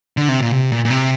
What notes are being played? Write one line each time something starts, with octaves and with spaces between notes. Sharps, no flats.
D3
C3
A#2
C3
A#2
A#2
C3